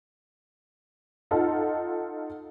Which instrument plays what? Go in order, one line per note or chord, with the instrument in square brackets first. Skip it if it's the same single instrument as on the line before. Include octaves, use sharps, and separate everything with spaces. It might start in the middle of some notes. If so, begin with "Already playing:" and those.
[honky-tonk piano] D#4 F4 A4 F#5